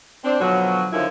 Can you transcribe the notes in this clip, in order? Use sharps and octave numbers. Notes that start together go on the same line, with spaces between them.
C4 D4 C5
B2 D3 F3 F#3
F#2 D3 D#3 F3 C#4 E4